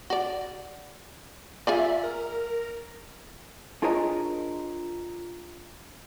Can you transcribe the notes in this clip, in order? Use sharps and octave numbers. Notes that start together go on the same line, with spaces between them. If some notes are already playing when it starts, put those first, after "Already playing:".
F#4 D5
F4 G#4 D5 E5
A#4
D4 F4 G#4 A#4 C#5 D#5